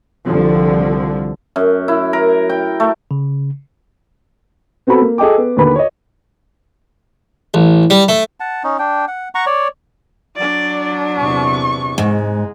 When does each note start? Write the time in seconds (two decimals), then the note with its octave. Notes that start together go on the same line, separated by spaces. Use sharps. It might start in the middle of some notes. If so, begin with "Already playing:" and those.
0.24 C2 D3 F3
1.56 F#2
1.88 E4
2.13 A#4
2.49 G5
2.80 A3
3.11 C#3
4.87 B3 C4 F#4 A4 B5
5.02 A#3
5.18 G#4 A4 D#5 G5 D6
5.38 B3
5.57 D#2 D3 B4 B5
5.75 C#5 D#5
7.54 A1
7.90 G3
8.08 A3
8.40 F#5 A5
8.64 C#4 D#4
8.79 D4 G5
9.08 F#5
9.35 F#5 A#5 C#6
9.46 C#5 D5
10.37 F#3 D4 D5
11.17 E2 C3 C#6
11.98 G#2 G#3